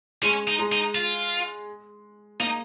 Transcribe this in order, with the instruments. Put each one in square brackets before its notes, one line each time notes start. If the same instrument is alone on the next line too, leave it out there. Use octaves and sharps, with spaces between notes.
[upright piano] G#3 [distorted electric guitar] C#4
[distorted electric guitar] D#4
[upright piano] G#3
[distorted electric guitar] D#4
F4
[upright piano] A#3 [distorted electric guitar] D#4